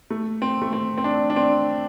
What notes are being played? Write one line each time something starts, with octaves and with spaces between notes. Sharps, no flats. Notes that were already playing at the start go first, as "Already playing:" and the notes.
A3
C4
A3
C4
C4
D4
D4
C4